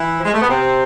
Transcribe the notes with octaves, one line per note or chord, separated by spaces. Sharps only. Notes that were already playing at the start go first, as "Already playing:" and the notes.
Already playing: E3 E4
F3
G#3
A3
B3
C3 C4